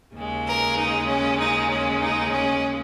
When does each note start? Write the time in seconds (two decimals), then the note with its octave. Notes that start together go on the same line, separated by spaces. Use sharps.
0.16 D#2 C#3 G#3
0.47 A#4
0.77 D#4
1.08 C#4
1.39 D#4
1.70 C#4
2.01 D#4
2.31 C#4